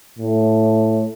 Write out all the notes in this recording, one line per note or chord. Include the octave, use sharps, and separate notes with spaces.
A2